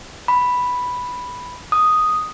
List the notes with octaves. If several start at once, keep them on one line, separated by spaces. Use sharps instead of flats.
B5
D#6